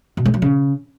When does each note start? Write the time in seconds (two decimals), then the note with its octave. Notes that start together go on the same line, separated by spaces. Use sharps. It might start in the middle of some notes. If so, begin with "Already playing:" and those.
0.17 B2
0.25 G#3
0.34 F#3
0.42 C#3